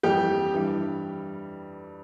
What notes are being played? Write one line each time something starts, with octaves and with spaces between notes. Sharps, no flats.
F2 E3 G3 G4 G5
G2 E3 G3